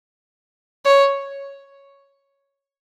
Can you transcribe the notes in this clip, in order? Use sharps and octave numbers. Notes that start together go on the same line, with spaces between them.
C#5